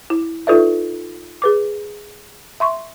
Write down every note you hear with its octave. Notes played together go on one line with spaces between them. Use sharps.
E4
D#4 F4 A4 B4 D5 E5
G#4 B4 D6
E5 C6 C#6